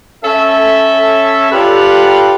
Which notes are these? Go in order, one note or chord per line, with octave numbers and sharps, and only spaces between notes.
C#4 A4 E5
F4 G4 A4 B4 D5 F#5